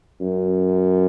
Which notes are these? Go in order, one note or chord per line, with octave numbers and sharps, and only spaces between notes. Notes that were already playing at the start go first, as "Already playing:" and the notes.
F#2